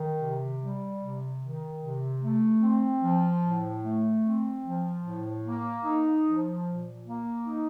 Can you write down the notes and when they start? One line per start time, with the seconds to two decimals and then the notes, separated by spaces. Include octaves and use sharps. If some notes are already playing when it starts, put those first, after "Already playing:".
Already playing: D#3
0.19 C3
0.60 G3
1.00 C3
1.40 D#3
1.80 C3
2.21 A3
2.62 C4
3.02 F3
3.42 A2
3.82 A3
4.23 C4
4.64 F3
5.03 A2
5.44 A#3
5.85 D#4
6.24 F3
6.66 A#2
7.06 A#3
7.46 D#4